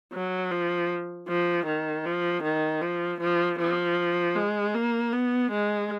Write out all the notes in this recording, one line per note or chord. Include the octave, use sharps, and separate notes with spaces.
F#3
F3
F3
D#3
F3
D#3
F3
F3
F3
G#3
A#3
B3
G#3